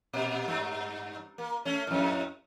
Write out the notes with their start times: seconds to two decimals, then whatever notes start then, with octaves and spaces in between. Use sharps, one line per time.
0.13 A#2
0.48 G2
1.38 A#3
1.65 A3 C#4
1.87 F2 A2